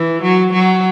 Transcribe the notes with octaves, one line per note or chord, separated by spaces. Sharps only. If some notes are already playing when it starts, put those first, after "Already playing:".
Already playing: E3
F#3
F#3